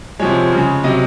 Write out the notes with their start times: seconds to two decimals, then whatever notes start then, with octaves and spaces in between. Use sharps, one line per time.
0.19 C3 F3 G#3 C#5
0.52 C#3 G#3
0.84 C3 F#3 D#5